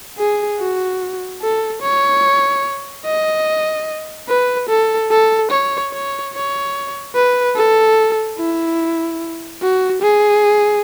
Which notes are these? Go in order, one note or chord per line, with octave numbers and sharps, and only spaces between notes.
G#4
F#4
A4
C#5
D#5
B4
A4
A4
C#5
C#5
C#5
B4
A4
E4
F#4
G#4